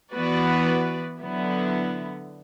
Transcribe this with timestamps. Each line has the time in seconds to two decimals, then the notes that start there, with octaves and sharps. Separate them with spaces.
0.12 E3 B3 F#4 B4 D5
1.20 D3 F#3 B3 E4